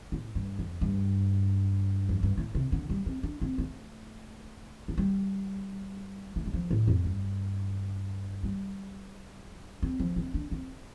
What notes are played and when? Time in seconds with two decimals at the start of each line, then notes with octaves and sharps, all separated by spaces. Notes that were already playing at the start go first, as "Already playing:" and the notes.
0.12 A2
0.35 G2
0.59 F2
0.81 G2
2.09 F2
2.23 G2
2.38 A2
2.55 C3
2.72 D3
2.90 G3
3.06 C4
3.23 D4
3.41 C4
3.58 A3
4.88 F3
4.98 G3
6.36 A3
6.46 G3
6.54 F3
6.71 A2
6.87 F2
7.04 G2
8.43 G3
9.82 C4
10.00 F3
10.16 C4
10.34 D4
10.51 C4